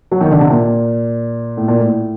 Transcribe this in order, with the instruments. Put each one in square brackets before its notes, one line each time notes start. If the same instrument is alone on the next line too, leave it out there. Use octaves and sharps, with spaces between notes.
[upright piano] F#3
D#3
D3
C3
A#2
A2
A#2
A2